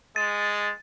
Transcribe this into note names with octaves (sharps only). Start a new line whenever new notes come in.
G#3 A6